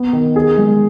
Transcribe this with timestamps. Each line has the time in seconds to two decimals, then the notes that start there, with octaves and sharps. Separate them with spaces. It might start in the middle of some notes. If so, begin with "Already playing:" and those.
Already playing: B3
0.13 D#3
0.36 G#4
0.58 G#3